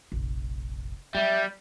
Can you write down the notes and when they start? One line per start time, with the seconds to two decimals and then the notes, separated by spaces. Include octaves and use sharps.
0.12 F1 A#1
1.15 F#3 G3 B3 E5